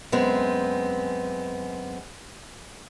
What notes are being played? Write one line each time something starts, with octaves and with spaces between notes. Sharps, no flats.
F#2 G#3 B3 C4